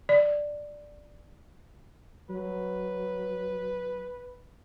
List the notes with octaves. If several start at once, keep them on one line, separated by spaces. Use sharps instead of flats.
D5
F#3 B4